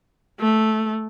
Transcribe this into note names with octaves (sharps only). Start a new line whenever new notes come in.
A3